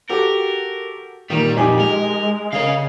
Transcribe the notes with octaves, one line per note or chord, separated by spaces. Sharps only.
F#4 G4 A4 A#4
A#2 D#3 G3 A#3
F2 D#4 G4 G#5
G#3 A#4
C#3 A#4 C#5 D#5 F5